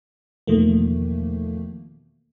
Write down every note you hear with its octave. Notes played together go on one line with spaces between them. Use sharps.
E2 B2 D#3 F3 A3 A#3